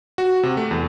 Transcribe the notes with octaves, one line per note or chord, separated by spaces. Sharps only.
F#4
C3
A3
E2